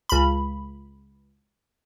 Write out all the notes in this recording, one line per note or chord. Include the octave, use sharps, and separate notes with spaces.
C#2 B5